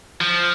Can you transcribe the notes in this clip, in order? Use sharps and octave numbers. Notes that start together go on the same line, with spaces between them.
F3